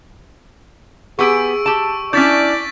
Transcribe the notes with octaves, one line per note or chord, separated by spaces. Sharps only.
B3 G4 G#4 G#5 C#6 E6 D7
G4 A5
C#4 D4 E4 D5 G6 A6 B6